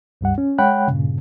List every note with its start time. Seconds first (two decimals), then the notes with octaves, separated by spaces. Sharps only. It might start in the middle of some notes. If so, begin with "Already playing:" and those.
0.21 C#2 G2 G3 F#5
0.38 C#4
0.58 G#3 C#5 F#5 G5 B5 F#6
0.88 G2 A#2 C#3